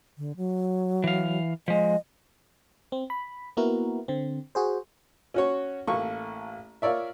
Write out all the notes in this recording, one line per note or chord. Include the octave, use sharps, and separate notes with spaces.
D3
F#3
E3 F5
F3 G#3 D#5
C4
B5
A#3 B3 E4 F#4 A#4
D3 C4
F#4 G#4 C5
C#4 F#4 C#5
A1 A#3 A4 C#6
F4 A#4 C#5 D5 E5